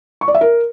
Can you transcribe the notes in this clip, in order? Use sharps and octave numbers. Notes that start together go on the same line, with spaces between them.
C#6
D5
E5
A#4